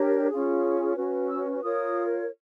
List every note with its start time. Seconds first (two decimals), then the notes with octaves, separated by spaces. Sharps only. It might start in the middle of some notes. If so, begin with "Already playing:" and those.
Already playing: D4 G4 A#4 C#5
0.30 C#4 F4 G#4
0.96 C#4 F#4 B4
1.29 E6
1.62 F4 A#4 C#5 D#6